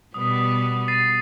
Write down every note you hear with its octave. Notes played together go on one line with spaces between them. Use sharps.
B2 G3 B3 D#6
A6 C7 D#7